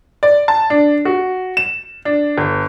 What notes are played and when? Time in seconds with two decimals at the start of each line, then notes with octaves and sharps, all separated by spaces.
0.23 D5
0.48 A5
0.70 D4
1.05 F#4
1.57 E7
2.05 D4
2.38 G1